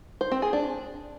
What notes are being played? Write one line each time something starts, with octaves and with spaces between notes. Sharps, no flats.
C5
C4
G#4
D4